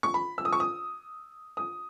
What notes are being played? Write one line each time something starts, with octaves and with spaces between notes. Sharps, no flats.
C#6
B5
E6
D#6
C#6
D#6
D#6